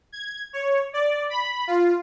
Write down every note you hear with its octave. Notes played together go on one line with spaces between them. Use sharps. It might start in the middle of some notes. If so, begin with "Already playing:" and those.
G#6
C#5
D5
B5
F4